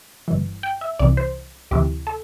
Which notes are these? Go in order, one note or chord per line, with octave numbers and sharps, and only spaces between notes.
G1 G2 E3
G5
E5
C2 C3 E3 D5
C5
D2 C3 E3 G4
A4